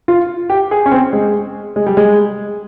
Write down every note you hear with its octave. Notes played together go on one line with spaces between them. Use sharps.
F4
G4
G#4
C#4
C4
G#3
G#3
G3
G#3